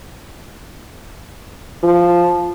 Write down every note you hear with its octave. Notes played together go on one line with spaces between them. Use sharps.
F3